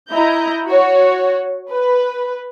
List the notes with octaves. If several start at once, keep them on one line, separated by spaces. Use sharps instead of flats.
E4 D#5 A#5 G6
F#4 C#5
B4